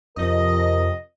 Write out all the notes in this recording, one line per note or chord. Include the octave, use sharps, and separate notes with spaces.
F2 C3 F3 A#4 D#5